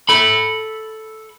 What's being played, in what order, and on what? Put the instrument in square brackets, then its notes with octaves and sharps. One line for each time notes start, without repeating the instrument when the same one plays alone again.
[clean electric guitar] A4 B5